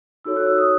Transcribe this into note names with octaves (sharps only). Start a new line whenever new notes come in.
D#4 F#4 A4 C#5 E6
F#6
E6
D#6